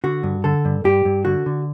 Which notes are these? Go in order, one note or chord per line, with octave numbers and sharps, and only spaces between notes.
D3 F#4
G2
D3 A4
G2
G2 G4
G2
D3 F#4
D3